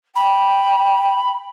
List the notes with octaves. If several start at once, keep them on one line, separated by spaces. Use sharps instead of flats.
G5 B5